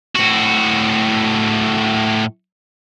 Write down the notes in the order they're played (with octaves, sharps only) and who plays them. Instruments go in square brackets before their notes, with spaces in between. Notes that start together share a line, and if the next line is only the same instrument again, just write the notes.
[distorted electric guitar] A2 F#4